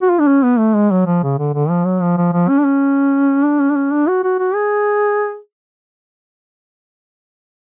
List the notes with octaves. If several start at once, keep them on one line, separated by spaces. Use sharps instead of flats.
F#4
F4
D4
C#4
B3
A3
G#3
F#3
F3
C#3
D3
D3
F3
F#3
F3
F3
F3
C#4
D4
C#4
D4
C#4
D4
C#4
D4
F#4
F#4
F#4
G#4